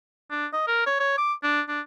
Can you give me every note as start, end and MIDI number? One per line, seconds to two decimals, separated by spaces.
0.31 0.46 62
0.53 0.63 75
0.67 0.85 70
0.87 0.95 73
1.00 1.15 73
1.18 1.33 86
1.43 1.61 62
1.68 1.80 62